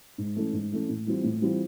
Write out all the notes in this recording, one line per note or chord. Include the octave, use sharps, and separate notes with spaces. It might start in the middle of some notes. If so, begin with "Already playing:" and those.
G#2
E3 A3 C#4
G#2
E3 A3 C#4
A2
E3 G3 C4 F4
A2
E3 G3 C4 F4